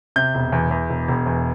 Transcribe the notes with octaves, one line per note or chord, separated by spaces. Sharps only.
C3 G6
E1
E2
E2
E1
E1
E2